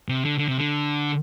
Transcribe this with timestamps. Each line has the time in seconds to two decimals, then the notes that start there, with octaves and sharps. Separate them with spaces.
0.09 C3
0.24 D3
0.38 D3
0.48 C3
0.58 D3